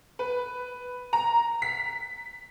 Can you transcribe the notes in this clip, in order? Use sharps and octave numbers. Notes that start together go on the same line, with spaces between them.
B4
A#5
B6